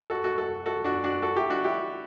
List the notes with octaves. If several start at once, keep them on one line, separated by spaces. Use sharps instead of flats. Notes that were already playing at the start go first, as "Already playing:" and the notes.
F#4 A4
F#4 A4
F#4 A4
F#4 A4
D4 F#4
D4 F#4
F#4 A4
E4 G4
D4 F#4
E4 G4